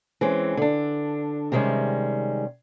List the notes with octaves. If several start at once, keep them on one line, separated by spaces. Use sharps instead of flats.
E3 G#3 C4 C#4
D3 D4
C3 D#3 G3 G#3 C#4